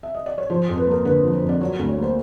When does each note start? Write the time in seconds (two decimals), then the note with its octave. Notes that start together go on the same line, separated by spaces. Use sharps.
0.03 E5
0.15 D#5
0.26 D5
0.38 C#5
0.50 F3 C5
0.69 F2
0.77 B4
0.87 A#3 A#4
1.05 D3 B4
1.24 F3
1.33 C5
1.42 F2
1.49 D5
1.60 F#3 C#5
1.79 D2
1.89 C#5
1.98 A#3 C5